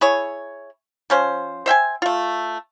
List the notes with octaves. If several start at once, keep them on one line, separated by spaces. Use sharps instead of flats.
E4 G#4 C#5
F3 C#4 C5
C5 E5 G5 G#5
A3 F4